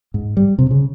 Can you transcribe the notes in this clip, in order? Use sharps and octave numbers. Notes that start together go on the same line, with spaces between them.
G#2
G3
C3
C#3